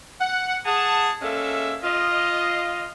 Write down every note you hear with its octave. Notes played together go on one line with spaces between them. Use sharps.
F#5
G#4 F#5 A5
G#3 A#3 C#4 A4 E5
F4 D#5